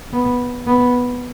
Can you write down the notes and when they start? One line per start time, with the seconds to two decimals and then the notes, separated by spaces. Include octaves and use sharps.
0.13 B3
0.67 B3